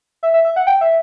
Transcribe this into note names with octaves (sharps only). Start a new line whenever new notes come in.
E5
E5
E5
F#5
G5
E5